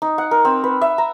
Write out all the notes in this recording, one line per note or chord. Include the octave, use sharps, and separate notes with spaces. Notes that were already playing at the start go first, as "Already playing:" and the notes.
D#4
F#5
A#4
C4
B4
E5
A#5